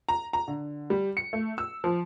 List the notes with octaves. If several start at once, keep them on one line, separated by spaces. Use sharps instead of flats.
A#5
A#5
D3
G3
C#7
A3
E6
F3